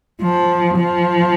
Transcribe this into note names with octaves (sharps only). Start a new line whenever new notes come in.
F3
F3